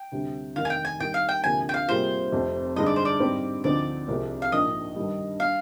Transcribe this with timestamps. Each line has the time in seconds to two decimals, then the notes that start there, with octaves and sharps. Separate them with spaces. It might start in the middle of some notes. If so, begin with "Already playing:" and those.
Already playing: G5
0.12 D2 C3 G3
0.56 F1 D#2 D#3 F5
0.65 G#5
0.70 G5
0.85 G#5
1.00 D#2 D#3 G3 G5
1.14 F5
1.29 G5
1.44 D2 C3 F3 A#3 D4 G#5
1.69 G5
1.74 F5
1.88 C3 G3 A#3 F4 G#4 C5
2.32 F1 F2 C3
2.76 G2 D3 G#3 D#4 D#5
2.86 D5
2.96 C5
3.05 D5
3.20 G#2 G3 C4 G4
3.64 D2 D3 F3 C4 D#4 D5
4.08 C2 C3 F3 G#3
4.42 F5
4.52 A#1 G#2 F3 A#3 D4 D#5
4.96 G2 D#3 G3
5.40 G3 D4 F5